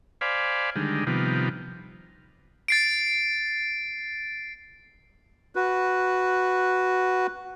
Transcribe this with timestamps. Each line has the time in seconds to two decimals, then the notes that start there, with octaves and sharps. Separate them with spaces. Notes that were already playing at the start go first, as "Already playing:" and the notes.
0.21 C5 D5 F5 G#5 B5
0.76 D3 D#3 G3 G#3
1.07 C3 D#3 F3 G3 B3
2.68 A6 C7 D7
5.55 F#4 B4